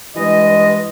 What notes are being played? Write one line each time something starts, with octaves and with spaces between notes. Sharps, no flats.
G2 E3 G#3 D#5